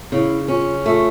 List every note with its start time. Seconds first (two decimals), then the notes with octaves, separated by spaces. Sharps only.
0.12 C#3 E4
0.48 C#4 F4
0.86 A3 F4